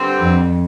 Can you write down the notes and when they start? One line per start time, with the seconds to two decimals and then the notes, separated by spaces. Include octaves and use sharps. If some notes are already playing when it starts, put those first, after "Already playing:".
Already playing: G2 D3 G3 C4
0.20 F2